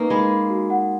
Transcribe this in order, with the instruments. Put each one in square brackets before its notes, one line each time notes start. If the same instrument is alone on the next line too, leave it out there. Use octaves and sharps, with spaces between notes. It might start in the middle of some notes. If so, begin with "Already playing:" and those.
Already playing: [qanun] A#3 C#4 D#4 [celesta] B4
[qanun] G#3 [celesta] B5
[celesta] B5
F#4
F#5